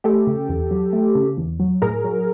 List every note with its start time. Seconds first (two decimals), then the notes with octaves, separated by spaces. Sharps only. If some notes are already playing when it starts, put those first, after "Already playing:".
0.04 A3 G4 A4
0.27 C#3
0.49 E2
0.71 F#3
0.93 A3
1.15 C#3
1.37 E2
1.60 F#3
1.82 A2 G#4 A#4
2.04 F#3